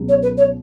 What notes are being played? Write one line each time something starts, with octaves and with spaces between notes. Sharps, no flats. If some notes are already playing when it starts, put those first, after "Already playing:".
Already playing: C#2 B2 F#3
C#5
B4
C#5